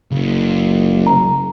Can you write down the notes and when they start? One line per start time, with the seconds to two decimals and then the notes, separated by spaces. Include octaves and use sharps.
0.11 F#1 C#2
1.07 A#5